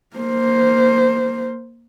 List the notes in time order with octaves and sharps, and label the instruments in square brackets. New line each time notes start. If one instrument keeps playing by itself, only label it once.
[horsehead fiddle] A#3 C5